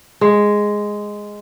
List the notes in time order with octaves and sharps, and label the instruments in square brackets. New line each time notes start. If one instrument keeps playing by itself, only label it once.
[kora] G#3